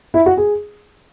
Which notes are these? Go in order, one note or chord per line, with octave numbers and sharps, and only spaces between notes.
E4
F#4
G#4